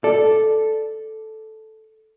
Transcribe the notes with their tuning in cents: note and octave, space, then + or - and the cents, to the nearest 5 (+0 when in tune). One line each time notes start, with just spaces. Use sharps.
A4 -5 D5 +0